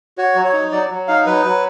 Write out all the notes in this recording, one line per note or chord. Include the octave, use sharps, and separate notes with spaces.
F#4 C#5
F#3
C#5
D#4
F#3 D5
F#3
D#4 F5
F#3 B4
F#3